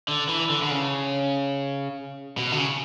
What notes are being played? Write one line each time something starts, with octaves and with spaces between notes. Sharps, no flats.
D3
E3
D3
D3
C#3
B2
D3
C#3